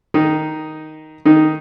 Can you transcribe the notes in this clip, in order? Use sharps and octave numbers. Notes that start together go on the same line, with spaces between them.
D#3 D#4
D#3 D#4